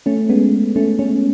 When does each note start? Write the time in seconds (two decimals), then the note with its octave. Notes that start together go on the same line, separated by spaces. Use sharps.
0.06 A3 C#4
0.29 G#3 B3
0.76 A3 C#4
0.99 A3 C#4